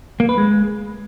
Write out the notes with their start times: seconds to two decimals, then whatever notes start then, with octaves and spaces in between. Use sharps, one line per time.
0.20 A#3
0.29 B4
0.38 G#3